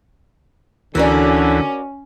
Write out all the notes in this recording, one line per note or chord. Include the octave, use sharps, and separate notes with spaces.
D2 D3 E3 C#4 F#4 A#4 D5